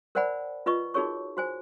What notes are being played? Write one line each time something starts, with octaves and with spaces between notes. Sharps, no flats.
A#4 C5 D5 F#5 G#5 B5
F4 B4 D#5 C#6
D#4 F#4 G#4 A#4 C#5 C#6
F#4 C5 G#5